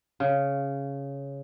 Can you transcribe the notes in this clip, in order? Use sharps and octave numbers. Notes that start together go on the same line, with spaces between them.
C#3